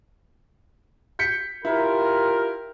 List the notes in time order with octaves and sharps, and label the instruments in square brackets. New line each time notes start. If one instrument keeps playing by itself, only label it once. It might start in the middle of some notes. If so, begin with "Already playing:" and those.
[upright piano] G6 B6 C#7
[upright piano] E4 [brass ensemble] F4 G4 A#4